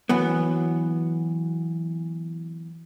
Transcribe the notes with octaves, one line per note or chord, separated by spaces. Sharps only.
E3 F#3 B3